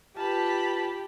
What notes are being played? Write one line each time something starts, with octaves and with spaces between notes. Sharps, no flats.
F4 G4 B4 A5 B5